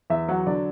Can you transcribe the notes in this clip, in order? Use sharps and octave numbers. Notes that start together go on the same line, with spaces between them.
E2 E5
F#3 F#5
D3 D5